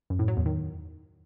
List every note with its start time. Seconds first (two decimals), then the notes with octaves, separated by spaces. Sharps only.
0.10 F#2
0.19 A2
0.28 F#3
0.37 E2
0.46 D#3